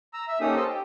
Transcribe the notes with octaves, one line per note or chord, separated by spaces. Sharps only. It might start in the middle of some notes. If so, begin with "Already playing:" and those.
A#5 E6
E5 E6
A#3 C#4 D#4 G4 A4 D#6
C5 D#5 A5 E6
G4 G5